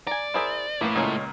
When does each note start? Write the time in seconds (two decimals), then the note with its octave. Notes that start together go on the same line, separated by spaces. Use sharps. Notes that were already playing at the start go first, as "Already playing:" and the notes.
0.07 D5 G#5 A#5
0.34 E4 G#4 A#4 C5 E5
0.81 A2 A3 A#3 E4 B4
0.95 C#2 A#2 G#3 C#4 D#4